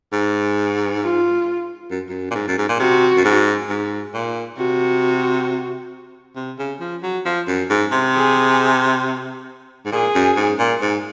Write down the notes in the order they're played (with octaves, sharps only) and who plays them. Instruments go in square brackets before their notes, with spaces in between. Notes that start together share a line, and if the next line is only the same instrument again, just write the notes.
[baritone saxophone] G#2
[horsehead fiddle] F4
[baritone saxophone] F#2
F#2
A#2
G#2
F#2
G#2
A#2
[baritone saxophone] C3 [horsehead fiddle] F#4
[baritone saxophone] F#2
G#2
G#2
A#2
[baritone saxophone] C3 [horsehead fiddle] F#4
[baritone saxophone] C3
C#3
F3
F#3
F3
F#2
G#2
C3
[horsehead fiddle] G#4
[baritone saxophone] G#2
[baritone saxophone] A#2 [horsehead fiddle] G#4
[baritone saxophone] F#2
G#2
A#2
G#2